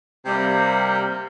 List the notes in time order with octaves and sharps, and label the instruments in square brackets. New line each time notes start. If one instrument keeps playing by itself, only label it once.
[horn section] C3 G3 A#3